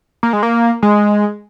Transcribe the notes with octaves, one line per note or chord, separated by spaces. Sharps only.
A#3
G#3
A#3
G#3